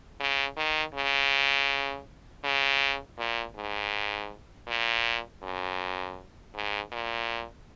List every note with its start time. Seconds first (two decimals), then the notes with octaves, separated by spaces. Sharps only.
0.20 C#3
0.57 D#3
0.94 C#3
2.44 C#3
3.18 A#2
3.56 G#2
4.68 A#2
5.43 F#2
6.54 G#2
6.92 A#2